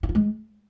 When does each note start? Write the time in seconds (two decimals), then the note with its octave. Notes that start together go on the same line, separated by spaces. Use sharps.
0.03 E4
0.09 F4
0.15 G#3